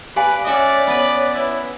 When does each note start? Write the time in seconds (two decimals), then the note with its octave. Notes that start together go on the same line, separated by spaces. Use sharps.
0.16 G4 B4 D5 F5 G#5
0.47 C#4 F#4 C#5 D5 E5
0.87 B3 B4
1.35 E4